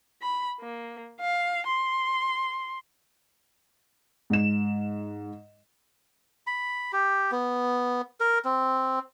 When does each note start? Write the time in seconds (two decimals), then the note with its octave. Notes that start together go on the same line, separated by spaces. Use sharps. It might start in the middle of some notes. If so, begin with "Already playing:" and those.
0.22 B5
0.61 A#3
1.21 F5
1.67 C6
4.30 G#2 E7
6.47 B5
6.93 G4
7.31 B3
8.20 A#4
8.45 C4